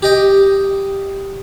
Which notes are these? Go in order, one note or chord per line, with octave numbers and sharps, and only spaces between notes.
G4 D#5 G5